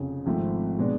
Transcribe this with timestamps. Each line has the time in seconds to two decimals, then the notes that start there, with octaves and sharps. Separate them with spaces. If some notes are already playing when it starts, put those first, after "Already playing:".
Already playing: F1 F2 C#3
0.26 G#1 G#2 F3 A3 C4
0.79 B2 G#3 B3 D4